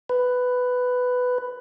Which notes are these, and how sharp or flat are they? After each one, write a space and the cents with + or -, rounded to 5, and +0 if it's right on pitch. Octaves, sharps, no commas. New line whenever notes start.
B4 +10